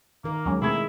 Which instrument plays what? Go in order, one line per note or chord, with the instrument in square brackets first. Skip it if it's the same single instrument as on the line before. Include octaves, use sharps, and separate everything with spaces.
[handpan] D#3 A#4 [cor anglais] A#3
[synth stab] D#2 F#3 C#4 [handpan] G#3
[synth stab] B2 A3 C4 [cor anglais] E4 [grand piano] G#4 C#6 G#6